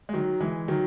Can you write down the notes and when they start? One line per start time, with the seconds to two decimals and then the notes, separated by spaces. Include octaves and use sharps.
0.09 G#3
0.14 D#3 F#3
0.40 E3 G#3
0.68 D#3 F#3